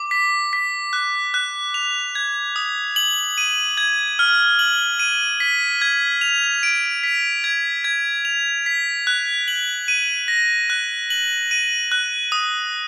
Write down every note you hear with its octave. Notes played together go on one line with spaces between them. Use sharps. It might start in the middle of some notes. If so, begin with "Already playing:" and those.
Already playing: D6
B6
B6
F#6
F#6
F7
G#6
D#6
F#7
D#7
G#6
F6
F#7
D#7
B6
G#6
F7
D7
B6
G#6
G#6
F7
B6
F#6
F#7
D#7
A#6
F#6
F#7
D#7
F#6
D#6